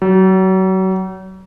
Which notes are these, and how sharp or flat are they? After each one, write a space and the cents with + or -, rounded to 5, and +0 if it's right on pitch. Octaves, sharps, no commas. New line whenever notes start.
F#3 +30